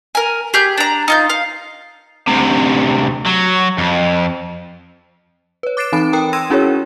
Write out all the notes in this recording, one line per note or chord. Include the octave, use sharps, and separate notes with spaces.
A#4 G#5
G4 G#4 G6
D4 A#5
D#4 F4 G6
F5
D2 C3
F#3
F2
B4 C#5
D6 F#6 A6 C7 D7 E7
E3 C4 D#4 A5 B5 D7
A#4 G5 A#5 D#6 F#6
C6 E6 G#6 A#6 D#7 E7
C#4 E4 F#4 G#4 A#4 C#5